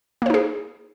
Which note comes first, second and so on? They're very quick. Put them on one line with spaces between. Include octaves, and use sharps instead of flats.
A#3 C5 D#4 G#4